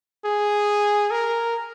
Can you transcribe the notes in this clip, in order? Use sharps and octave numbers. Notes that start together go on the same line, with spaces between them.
G#4
A#4